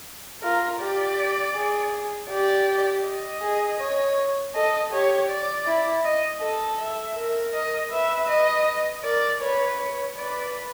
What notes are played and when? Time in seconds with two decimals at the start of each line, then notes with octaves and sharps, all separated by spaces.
0.42 F4 A#4
0.80 G4 D5
1.55 G#4
2.29 G4 D5
3.05 D#5
3.42 G#4
3.80 C#5
4.55 A4 D#5
4.92 G4 C#5
5.29 D5
5.66 E4
6.04 D#5
6.41 A4 D#5
6.78 E5
7.17 A#4
7.53 D#5
7.91 B4 E5
8.29 D#5
9.04 A#4 D5
9.41 B4 C#5
9.78 C#5
10.16 B4 D5